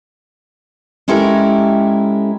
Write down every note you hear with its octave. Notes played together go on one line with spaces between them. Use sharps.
G#3 C#4 E4 G4 A4 A#4